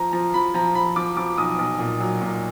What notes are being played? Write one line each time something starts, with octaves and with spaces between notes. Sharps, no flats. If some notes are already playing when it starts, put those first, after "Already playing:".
Already playing: F3 A#5
F3 A#5
F3 B5
F3 A#5
F3 B5
F3 D6
F3 D6
B1 D#6
B1
A#2
F#3
A#2